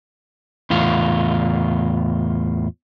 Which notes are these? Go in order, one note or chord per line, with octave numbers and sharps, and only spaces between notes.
E2 A2 F4